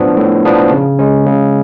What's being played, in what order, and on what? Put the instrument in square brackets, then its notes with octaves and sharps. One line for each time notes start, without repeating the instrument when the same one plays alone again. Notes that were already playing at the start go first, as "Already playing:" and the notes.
Already playing: [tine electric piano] A2 F3 B3 D4
A2
F3 B3 D4
C#3
G#3 C#4
C#3